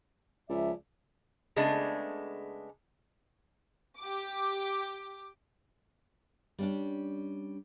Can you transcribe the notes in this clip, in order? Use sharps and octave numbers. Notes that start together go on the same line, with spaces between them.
C#2 F3 D5 E5
C#3 G#3 A3 B3 D4
G4 D6
G3 C#4 D4